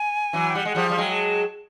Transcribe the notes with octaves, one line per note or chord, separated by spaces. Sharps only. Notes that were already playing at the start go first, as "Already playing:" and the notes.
Already playing: G#5
E3 F#3
G5
G3 F#5
G#3
F3 G3
F5
G3
F#3 G#3
A5